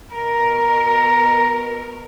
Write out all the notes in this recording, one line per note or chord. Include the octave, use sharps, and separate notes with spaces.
B2 A#4 A#5